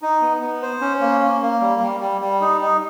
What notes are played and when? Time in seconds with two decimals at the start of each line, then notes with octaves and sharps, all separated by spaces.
0.02 D#4
0.21 B3
0.41 B3
0.62 C5
0.81 C#4
1.01 A#3
1.21 A#3
1.42 A#3
1.61 G3
1.81 G3
2.01 G3
2.21 G3
2.41 D#4
2.61 D#4